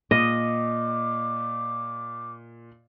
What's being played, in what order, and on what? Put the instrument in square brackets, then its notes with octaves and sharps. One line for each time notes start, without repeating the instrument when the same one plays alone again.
[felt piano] A#2 [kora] D#5 [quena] D6